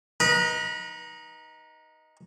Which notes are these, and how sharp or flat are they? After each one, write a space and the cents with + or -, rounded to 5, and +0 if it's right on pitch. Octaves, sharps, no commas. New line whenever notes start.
D#4 +5 B4 -35